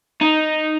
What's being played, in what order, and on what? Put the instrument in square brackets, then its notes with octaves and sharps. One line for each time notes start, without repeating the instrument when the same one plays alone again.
[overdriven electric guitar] D#4